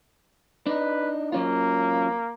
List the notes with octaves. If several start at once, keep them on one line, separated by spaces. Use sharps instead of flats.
D4 D#4 B4
F#3 A#3 C#4 F4